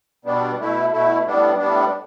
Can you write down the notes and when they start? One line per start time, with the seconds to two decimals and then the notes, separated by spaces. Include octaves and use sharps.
0.25 B2 G3 B3 D4
0.59 B2 A3 E4
0.92 B2 A3 E4
1.25 A2 G3 B3 D4
1.58 A2 G3 B3 D4